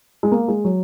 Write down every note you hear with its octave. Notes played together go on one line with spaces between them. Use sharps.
G#3
A#3
G#3
F#3